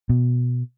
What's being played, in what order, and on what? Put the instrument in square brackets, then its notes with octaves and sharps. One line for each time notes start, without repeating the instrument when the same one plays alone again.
[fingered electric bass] B2